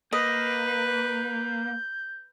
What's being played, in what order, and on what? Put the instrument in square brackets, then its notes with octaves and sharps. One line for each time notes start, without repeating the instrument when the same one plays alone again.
[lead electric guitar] A#3 [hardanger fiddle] B4 [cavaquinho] D#5 [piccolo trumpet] G6